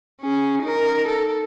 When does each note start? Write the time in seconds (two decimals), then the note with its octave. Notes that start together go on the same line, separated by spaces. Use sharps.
0.22 C#4 G#4
0.62 D#4 A#4
1.08 A4